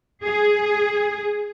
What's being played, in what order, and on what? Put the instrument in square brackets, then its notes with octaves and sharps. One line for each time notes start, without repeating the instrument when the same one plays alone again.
[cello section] G#4